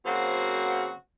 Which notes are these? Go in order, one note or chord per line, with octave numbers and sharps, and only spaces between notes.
C#3 F#3 A#3 C4 F#4 C5